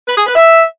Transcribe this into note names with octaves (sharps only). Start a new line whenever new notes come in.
B4
G#4
B4
E5